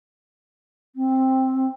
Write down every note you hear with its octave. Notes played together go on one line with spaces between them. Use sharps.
C4